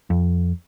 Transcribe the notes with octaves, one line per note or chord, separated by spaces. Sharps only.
F2